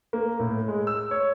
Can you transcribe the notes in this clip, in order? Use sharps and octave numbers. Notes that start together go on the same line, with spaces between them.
A#3
A2
G#3
E6
C#5